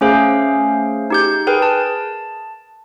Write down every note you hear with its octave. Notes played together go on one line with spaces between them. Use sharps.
A3 C#4 G#4 C5 F5
D#4 G4 G6
G#4 A#4 B4 G5
A5